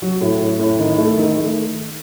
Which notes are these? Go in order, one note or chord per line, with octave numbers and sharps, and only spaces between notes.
F#3
A2
A2
A2
D#3
A3
D#3
A3